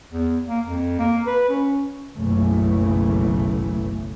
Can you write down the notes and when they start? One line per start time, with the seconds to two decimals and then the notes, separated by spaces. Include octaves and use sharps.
0.13 E2
0.49 A#3
0.67 F2
0.99 A#3
1.26 B4
1.49 C#4
2.17 F#1 B1 F#2 C#3 E3 A3